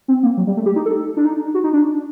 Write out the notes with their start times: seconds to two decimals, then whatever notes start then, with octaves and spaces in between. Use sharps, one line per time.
0.08 C4
0.23 A#3
0.37 F#3
0.47 G3
0.57 A3
0.66 G4
0.76 D#4
0.86 A4
1.17 D4
1.25 D#4
1.54 F#4
1.64 D#4
1.73 D4